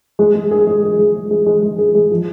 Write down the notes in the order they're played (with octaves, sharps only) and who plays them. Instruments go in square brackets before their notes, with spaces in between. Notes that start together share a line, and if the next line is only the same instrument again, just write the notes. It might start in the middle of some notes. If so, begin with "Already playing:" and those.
[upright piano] G#3
G#3
G#4
G#3
G#4
G#3
G#3
G#3
G#3
G#3
G#4
G#3
F3